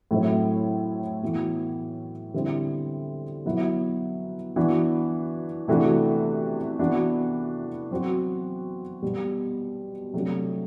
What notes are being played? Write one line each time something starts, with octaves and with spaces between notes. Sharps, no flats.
A2 F#3 A3 C4 E4
E3 B3 F#4
D3 G3 C4 E4
B2 F#3 B3 E4
E3 B3 D4 F#4
C3 E3 A3 D4 F#4
E3 B3 D4 F#4
F#3 C4 F#4
B2 G3 B3
C3 F#3 A3 D4 F#4